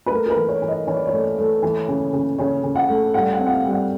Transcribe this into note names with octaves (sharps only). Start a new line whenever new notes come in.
B4
A3 A#4
A#4
B4
E3
C#5
E3
D#5
E3 C#5
D5
C#5
A3
A3
E3
C#3
C#3
C#3 C#5
C#3
F#5
A3
G3 F#5
F#5
C4
F#5
F5
G3
F#5